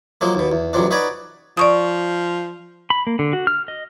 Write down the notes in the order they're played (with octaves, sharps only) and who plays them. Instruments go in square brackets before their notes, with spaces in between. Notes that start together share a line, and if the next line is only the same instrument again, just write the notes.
[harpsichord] F3 F#3 G#3 A#3
D#2 B2
E2
A1 F#2 C3 F3 D4
D#4 F#4 B4 C#5 D5
[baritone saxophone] F3 [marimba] D5 C#6 D#6
[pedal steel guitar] B5
A#3
D3
F#4
F6
D#5